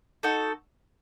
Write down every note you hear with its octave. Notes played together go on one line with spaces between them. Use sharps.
D#4 F#4 A4